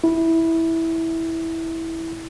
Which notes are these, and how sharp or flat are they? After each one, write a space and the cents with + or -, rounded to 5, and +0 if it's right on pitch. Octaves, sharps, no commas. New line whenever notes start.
E4 -10